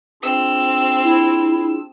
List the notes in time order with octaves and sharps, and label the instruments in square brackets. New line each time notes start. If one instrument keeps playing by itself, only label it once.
[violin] C4 [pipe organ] D4 F4 G#4 [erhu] E6
[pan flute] E4